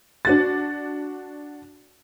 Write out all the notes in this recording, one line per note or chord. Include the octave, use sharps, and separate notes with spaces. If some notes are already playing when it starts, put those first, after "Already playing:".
D4 F#4 A6